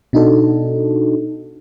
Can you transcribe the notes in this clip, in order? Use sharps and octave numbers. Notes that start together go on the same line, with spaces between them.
B2 D4 D#4 F#4 A4